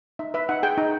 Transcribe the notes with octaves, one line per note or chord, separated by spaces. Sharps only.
D#4 E5
B4 E5
D#4 F#5
G#4 G5
D#4